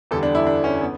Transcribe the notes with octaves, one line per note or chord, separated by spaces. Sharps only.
E2 D3 G3 A4
D4
E4
D4
C#4
B3